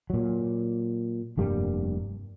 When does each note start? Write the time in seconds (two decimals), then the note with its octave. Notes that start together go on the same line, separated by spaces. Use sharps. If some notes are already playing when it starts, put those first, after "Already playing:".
0.10 A#2 F#3
1.37 F1 G2 G3 A#3